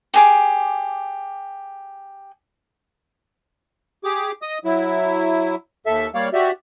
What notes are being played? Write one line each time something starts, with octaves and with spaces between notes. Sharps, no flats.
G4 G#4 D6
G4 G#4 D6
D#5 D#6
F#3 E4
D#2 A4 E5
G3 A#3 C#5 D5 F5
F#4 G4 D5 E5